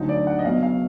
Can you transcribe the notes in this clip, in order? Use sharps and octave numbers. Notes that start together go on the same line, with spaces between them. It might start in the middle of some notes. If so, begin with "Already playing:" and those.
Already playing: D2 D3 F#3 D#4
D5
F#5
D#5
B1 B2 F#3 F5
F5